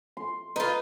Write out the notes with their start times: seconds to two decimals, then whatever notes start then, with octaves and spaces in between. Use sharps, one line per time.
0.17 C6
0.56 D#4 F4 B4